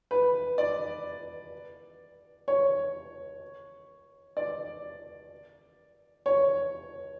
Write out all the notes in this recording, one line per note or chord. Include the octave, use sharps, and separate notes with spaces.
B4
D5
C#5
D5
C#5